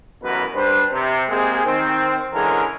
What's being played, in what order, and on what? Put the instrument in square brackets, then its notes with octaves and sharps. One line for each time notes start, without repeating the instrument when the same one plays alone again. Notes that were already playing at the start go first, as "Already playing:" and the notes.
[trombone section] A1 F#2 B2 E3 A#4 B4
G3 D4 B4 C5
C3
G#3 A#3 C4 G4 G#4
D#3 C4
D3 E3 G#3 C#4 G#4 A#4